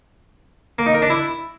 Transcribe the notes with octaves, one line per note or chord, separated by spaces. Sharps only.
A#3
D#4
A#4
D4
E4